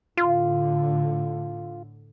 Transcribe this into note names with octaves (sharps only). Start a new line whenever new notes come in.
A2 D3 F4